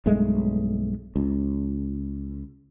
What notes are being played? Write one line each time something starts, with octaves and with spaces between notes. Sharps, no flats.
B1 G2 G#3 A3
C#2